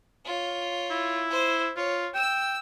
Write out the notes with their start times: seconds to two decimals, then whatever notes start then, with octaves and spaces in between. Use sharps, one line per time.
0.25 F4 C#5
0.91 E4
1.30 C5
1.77 F4 C#5
2.14 G5 E6